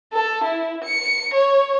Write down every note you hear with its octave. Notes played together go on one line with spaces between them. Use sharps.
A4
E4
C#7
C#5